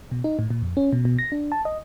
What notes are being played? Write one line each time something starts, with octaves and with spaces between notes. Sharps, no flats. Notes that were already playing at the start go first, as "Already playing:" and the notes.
B2
D#4
A2
A#2
F2
C#4
B2
B2
A#6
D4
A5
D#5